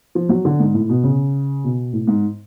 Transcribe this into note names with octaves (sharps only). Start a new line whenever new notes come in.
F3
F#3
D3
G#2
A2
B2
C#3
B2
A2
G#2